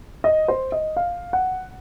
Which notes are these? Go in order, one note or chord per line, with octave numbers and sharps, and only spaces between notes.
D#5
C5
D#5
F5
F#5